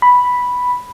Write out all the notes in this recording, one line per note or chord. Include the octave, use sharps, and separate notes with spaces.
B5